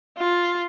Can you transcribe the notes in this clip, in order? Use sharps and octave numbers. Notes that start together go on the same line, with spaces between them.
F4